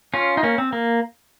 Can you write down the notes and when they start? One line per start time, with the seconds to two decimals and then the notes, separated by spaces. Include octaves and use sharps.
0.14 C#4 F4
0.37 D#4
0.43 A#3 C#4
0.58 C4
0.73 A#3